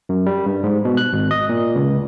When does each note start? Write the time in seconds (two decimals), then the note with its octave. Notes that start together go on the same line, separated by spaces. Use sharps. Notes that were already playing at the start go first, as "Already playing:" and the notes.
0.09 F#2
0.26 G3
0.46 G2
0.63 G#2
0.85 B2
0.97 F#6
1.13 G#1
1.31 D#5
1.49 A#2
1.75 C#2